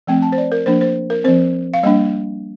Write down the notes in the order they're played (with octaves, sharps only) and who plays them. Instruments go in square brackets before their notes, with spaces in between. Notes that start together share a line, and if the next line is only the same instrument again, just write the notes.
[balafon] F3 A3 C4 G5
A5
C5
D5
A#4
F3 A#3 D4 C5
C5
A#4
F3 C4 C5
F5
G3 A#3 D4 D#5